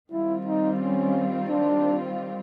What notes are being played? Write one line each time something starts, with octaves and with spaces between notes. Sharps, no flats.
D#3 G3 C4 E4 F4
D#4
C#4
D4